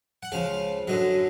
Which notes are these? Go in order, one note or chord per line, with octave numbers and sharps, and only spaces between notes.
F#5
C#2 C#3 F3 F5
F#2 D3 F#3 D#5